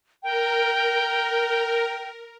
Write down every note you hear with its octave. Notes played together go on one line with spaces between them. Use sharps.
A#4 G5